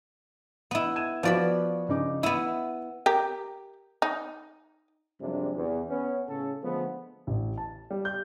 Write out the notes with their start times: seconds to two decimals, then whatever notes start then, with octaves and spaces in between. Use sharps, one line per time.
0.71 B3 E4
0.96 G#6 D#7 E7
1.23 F3 B3 F#4 D5 B5
1.89 C#3 D#4 D6
2.23 B3 E4 D#7
3.06 G4 A#4
4.02 D#4
5.21 F#2 C3 F3 G3 G#3 D4
5.55 E2
5.89 B3 C#4
6.29 A2 C#3 C#4 G#4 A4
6.63 D3 F3 G#3 A3 B3
7.27 A1
7.58 A5
7.91 G3
8.05 G6